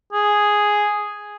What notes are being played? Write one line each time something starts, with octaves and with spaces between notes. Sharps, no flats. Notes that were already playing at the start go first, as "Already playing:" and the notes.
G#4